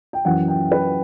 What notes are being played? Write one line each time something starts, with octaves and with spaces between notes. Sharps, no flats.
G5
F#2 E3 F#5
G5
B4